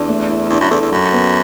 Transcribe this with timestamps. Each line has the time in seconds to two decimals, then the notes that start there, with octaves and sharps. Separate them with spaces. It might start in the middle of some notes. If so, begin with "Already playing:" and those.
Already playing: E2 D4
0.08 A3
0.29 E4
0.50 E2 D4
0.61 F#2
0.70 E2 A4
0.81 E2
0.92 F#2 F#3
1.12 B3